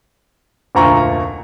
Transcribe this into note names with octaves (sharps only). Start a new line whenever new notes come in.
F1 D2 A#2 A#5 C#6